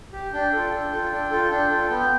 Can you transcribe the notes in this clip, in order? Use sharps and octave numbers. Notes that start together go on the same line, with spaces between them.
G4
D4 G5
F4 A4
D4
F4 A4
D4
F4 A4
D4 G5
F4 A4
B3 G5